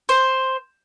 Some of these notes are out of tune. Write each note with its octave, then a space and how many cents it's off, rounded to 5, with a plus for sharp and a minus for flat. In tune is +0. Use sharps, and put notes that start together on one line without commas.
C5 +5